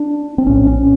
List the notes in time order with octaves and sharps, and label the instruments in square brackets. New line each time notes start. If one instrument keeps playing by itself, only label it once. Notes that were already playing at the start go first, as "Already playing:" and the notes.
Already playing: [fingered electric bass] D4
C4
A#1 A2 C#4
C#4